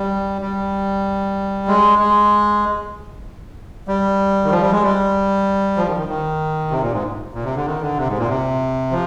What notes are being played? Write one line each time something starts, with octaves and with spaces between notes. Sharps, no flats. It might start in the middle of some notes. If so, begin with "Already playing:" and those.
Already playing: G3
G3
G#3
G#3
G3
D#3
F3
G3
G#3
G3
F3
D#3
D#3
D#3
C3
A#2
G#2
A#2
C3
D3
D#3
D3
C3
G#2
A#2
C3
F3